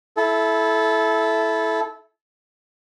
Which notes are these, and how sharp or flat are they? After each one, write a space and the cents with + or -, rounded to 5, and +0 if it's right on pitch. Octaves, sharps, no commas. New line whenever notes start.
E4 +0 A4 -20